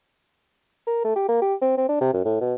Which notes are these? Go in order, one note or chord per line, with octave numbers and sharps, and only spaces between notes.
A#4
A3
G4
A#3
G4
C4
C4
D4
C3
F#2
A2
B2